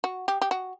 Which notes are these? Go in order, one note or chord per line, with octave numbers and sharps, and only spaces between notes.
F#4
G4
G4
F#4